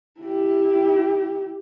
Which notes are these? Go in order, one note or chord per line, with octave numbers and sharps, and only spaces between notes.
E4 G4